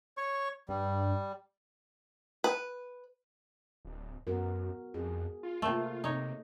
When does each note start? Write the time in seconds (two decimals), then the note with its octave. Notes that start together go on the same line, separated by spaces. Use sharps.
0.17 C#5 C#6
0.69 G2 G3
2.44 B4
3.85 D1
4.27 F#2 B3 F#4 A#4
4.94 F2 G#4
5.43 F4
5.62 C3 A3 A#3 A4 A#4
6.04 C3 D#4 C#5